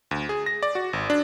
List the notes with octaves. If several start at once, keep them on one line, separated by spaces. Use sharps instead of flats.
D2
G#4
A#6
D5
F#4
G#1
D4